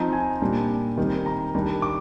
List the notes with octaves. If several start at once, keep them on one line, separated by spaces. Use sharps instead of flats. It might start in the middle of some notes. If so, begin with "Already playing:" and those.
Already playing: F3 C4 D#4 A#5
G#5
A#2 G3 D4
D#3 G3 C4
A#5
D#3 G3 D4
D6